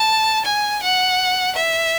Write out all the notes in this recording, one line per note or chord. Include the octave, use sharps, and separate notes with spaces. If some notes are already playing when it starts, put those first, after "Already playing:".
Already playing: A5
G#5
F#5
E5